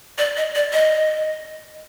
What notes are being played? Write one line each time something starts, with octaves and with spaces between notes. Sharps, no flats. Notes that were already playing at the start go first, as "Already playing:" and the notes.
D5
D#5
D5
D#5